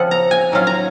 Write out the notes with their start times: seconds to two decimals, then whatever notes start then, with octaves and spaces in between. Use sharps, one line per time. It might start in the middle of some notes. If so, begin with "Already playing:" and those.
Already playing: C#3 F3 C4 F4 F#5
0.11 A#5
0.31 G#5
0.52 D#3 F#3 C#4 F4
0.67 A#5